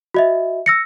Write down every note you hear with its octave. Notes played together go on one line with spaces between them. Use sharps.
F#4 D#5 E5
E6 A#6 C#7